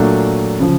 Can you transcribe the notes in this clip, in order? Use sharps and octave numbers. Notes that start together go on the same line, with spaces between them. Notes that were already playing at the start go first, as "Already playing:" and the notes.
Already playing: A#2 F#3 A3 D4
C#3 F3